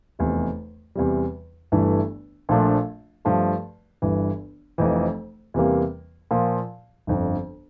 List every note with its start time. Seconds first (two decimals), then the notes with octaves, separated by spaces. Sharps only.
0.19 F1 E2 C3
0.95 E2 C3 G3
1.72 G1 G2 E3 A3 E4
2.49 A#1 A#2 F3 A3 D4
3.25 G2 F3 A3
4.02 G1 G2 E3
4.78 F1 F2 E3
5.54 E2 C3 E3 G3 A#3
6.31 A#2 F3 A#3 F4
7.07 G1 F2 D3